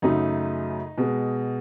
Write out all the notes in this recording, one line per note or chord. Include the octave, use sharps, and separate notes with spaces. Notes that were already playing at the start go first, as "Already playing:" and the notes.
F#2 C#3 F#3 A3 D#4
B2 G#3